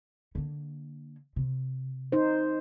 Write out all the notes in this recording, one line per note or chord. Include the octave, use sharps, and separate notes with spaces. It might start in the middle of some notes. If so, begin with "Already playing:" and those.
D3 A#3
C3
D#4 C5